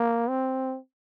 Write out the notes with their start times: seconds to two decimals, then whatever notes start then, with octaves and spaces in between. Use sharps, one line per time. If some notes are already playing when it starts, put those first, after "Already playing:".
Already playing: A#3
0.29 C4